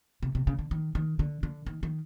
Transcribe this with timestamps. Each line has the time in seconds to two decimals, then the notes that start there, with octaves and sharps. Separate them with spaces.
0.23 C3
0.35 C3
0.47 C#3
0.59 D3
0.71 D#3
0.95 D#3
1.19 D3
1.43 D3
1.67 D#3
1.83 D#3